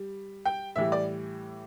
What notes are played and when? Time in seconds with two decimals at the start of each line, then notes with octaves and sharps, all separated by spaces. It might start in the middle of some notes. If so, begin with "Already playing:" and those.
Already playing: G3
0.45 G5
0.76 A2 E3 G3 E5
0.92 D5